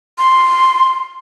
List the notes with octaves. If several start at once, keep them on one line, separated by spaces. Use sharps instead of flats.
C6